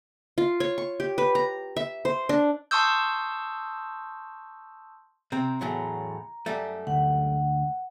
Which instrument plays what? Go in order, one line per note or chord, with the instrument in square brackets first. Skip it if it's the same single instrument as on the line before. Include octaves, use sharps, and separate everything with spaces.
[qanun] F4
C#5
C#6
G4
B4
A#5
E5
C5
D4
[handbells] A5 C6 C#6 D#6 E6 G6
[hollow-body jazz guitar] C3 C4 [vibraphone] A#5
[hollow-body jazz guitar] E2 A2 F#3
F#2 G3 A3
[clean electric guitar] D2 [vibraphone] F#5